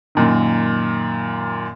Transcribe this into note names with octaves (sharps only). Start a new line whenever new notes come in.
F#2 A#2 D#3